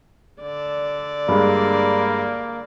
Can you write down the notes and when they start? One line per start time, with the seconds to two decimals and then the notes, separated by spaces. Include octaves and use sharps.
0.42 D3 D5
1.28 G2 G#3 A#3